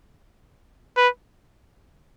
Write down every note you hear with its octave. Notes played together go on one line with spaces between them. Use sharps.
B4